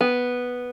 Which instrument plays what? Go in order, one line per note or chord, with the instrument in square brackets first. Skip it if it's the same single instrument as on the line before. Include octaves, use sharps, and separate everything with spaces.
[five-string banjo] B3